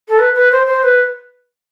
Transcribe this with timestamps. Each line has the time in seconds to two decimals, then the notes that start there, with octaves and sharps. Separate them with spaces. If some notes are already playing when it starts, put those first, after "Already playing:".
0.08 A4
0.19 B4
0.34 B4
0.51 C5
0.66 C5
0.83 B4